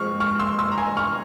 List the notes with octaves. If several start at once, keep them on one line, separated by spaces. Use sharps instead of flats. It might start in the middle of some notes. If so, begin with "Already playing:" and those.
Already playing: F3 G#3 C4 C#6 F6
C#6 F6
C6 E6
C6 E6
A#5
G#5 C6
C#6 F6